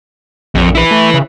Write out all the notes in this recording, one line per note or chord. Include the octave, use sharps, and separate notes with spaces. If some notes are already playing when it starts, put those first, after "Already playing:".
A#1 F2
E4 B4
A3
C#3